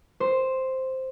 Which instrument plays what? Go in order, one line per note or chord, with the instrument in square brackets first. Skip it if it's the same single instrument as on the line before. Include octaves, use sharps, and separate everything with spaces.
[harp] C5